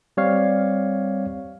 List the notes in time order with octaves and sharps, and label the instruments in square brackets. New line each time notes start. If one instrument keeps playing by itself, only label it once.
[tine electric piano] G3 C4 C#5 D5 F5